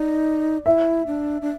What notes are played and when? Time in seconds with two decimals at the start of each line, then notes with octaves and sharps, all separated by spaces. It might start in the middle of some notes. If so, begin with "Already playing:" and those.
Already playing: D#4 D5
0.66 E4 E5
1.07 D4
1.42 D4